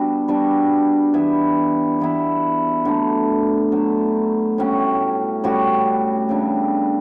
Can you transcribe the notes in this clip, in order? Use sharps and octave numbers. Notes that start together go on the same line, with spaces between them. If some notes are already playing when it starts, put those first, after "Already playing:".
Already playing: G3 B3 D4 F#4
G3 B3 D4 F#4
E3 B3 E4
E3 B3 E4
D3 F#3 A3
D3 F#3 A3
A2 G3 C#4 F#4
A2 G3 C#4 F#4
C#3 G3 B3 D4